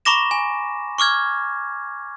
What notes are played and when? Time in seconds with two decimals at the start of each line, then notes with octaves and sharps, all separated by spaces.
0.05 A#5 B5 C#6 D6 A#6 E7
0.31 G#5
0.98 C#6 D6 F6 G#6